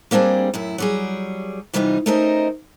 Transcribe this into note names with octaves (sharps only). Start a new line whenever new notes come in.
G3 A#3 C4 D4 G#4
F#2 A2 E4
F#3 G3 G#4
C3 E3 G3 B3 D#4 F4
A3 C#4 D#4 A#4 C5 D#5